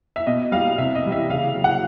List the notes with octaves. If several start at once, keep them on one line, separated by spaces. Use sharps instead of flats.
E5
B2 D#5
G3 F5
C3 E5
D#5
E3 G3
E5
C#3 F5
F#3
F#5